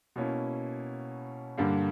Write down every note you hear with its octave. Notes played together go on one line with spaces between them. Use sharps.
B2 A#3 C#4 E4
G2 D3 G3 A#3